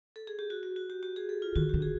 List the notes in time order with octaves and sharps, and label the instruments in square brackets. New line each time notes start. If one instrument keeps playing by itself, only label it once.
[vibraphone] A4
G#4
G4
F#4
F#4
F#4
G4
G4
G#4
A4
F4
[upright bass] D#3 [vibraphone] F#4
[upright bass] D3 [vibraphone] G4
[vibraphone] G#4